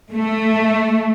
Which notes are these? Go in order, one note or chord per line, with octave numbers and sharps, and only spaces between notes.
A3